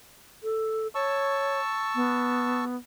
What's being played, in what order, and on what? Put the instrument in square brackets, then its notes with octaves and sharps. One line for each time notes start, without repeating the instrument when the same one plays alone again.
[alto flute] A4
[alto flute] C#5 [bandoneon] A5 C#6 E6
[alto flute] B3